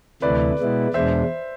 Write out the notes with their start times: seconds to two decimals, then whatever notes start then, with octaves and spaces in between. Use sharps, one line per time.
0.22 D2 C3 E3 A3 E4 B4 D5
0.58 B2 G#3 B3 E4
0.94 E2 B2 G#3 D4 C5 E5